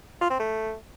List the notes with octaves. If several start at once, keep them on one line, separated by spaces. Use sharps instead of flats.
F4
C4
A3